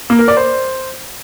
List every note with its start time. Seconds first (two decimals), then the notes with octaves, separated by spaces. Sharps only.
0.10 A#3
0.19 A#4
0.28 D5
0.37 C5